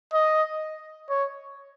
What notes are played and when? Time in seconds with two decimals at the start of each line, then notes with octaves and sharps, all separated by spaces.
0.13 D#5
1.09 C#5